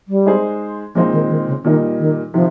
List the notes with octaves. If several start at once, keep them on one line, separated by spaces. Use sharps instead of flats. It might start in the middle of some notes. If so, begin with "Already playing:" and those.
G3
G#3 D#4 G#4 C5
A#2 F3 G#3 C4 D#4
D#3
D#3
C#3
A#2 D#3 G3 A#3 D#4
D#3
C3 D#3 F3